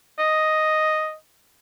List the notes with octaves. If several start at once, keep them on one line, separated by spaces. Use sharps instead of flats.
D#5